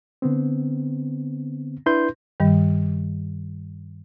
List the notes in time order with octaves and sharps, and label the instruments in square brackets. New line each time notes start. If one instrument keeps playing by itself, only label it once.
[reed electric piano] D3 B3 C4
D4 E4 B4 C6 G6
[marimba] G2 D#3 G3